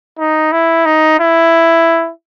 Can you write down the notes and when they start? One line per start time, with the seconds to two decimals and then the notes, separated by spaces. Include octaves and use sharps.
0.19 D#4
0.52 E4
0.86 D#4
1.20 E4